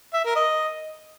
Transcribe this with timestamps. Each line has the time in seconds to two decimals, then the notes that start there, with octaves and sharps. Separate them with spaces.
0.13 E5
0.25 A#4
0.36 D#5